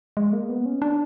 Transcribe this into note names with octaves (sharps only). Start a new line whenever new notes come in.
G#3
A#3
B3
C#4
D4